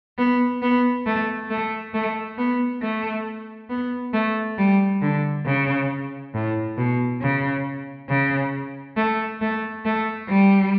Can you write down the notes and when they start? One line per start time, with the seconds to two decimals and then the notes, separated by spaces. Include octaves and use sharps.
0.18 B3
0.62 B3
1.06 A3
1.50 A3
1.94 A3
2.38 B3
2.82 A3
3.70 B3
4.14 A3
4.58 G3
5.02 D3
5.45 C#3
6.34 A2
6.77 B2
7.21 C#3
8.09 C#3
8.97 A3
9.41 A3
9.85 A3
10.29 G3